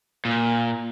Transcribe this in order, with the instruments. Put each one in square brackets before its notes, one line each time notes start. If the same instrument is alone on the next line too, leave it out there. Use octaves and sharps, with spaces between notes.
[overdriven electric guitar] A#2